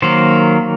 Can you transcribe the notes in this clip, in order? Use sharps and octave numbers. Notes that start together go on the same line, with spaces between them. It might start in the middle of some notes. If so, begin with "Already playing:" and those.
D#3 F#3 A#3 C5